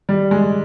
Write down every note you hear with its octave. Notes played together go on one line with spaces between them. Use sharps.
G3
G#3